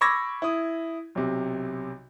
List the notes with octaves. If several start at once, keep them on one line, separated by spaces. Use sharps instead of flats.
B5 C#6 D6 E6 G#6 A#6
E4 D#6
B1 C3